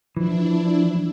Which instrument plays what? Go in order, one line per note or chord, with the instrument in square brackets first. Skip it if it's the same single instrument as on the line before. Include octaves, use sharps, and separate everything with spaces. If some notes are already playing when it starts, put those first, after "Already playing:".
[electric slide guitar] E3 [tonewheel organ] F3 [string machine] D4 E4